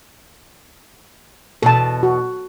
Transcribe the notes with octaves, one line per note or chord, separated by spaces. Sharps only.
E2 B2 A4 A5
F#4